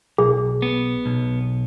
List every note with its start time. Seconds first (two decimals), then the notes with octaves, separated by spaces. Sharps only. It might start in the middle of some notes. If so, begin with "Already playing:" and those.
0.18 B1 G#4
0.62 B3
1.06 B1